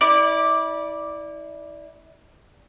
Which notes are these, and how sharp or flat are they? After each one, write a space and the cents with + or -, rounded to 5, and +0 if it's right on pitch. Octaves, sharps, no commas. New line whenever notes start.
E4 -30 D5 +0